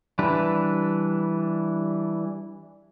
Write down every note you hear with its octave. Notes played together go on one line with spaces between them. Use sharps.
E3 G3 D4 B4